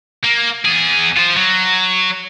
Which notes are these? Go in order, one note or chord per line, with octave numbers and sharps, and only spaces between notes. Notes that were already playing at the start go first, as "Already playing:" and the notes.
A#3
E2 G#4
F4 C5
F#3